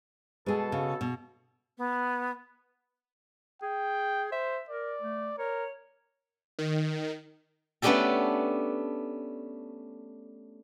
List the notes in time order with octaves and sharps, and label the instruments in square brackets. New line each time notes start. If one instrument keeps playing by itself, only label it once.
[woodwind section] B2 A4 [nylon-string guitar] G#3 G#4
[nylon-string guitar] C#3
B2
[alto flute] B3
[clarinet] G#4 [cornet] G5
[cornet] C5 [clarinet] E5
[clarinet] A#4 [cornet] D5
[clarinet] A3
[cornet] A#4 [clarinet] C#5
[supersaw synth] D#3
[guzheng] A3 B3 C#4 D4 G4 A4